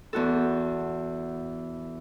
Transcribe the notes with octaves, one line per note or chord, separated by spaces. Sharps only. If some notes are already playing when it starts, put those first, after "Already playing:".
E2 F#4 A4